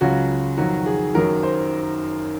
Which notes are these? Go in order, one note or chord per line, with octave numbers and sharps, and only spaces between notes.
C#2 C#3 F#3 F#4
F2 D#3 F#3 F#4
G#4
F#1 F#2 D#3 F#3 A#4
C5